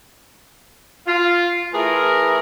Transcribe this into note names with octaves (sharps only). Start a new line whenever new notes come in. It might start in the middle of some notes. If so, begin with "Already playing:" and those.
F4
E3 A3 E4 G#4 A#4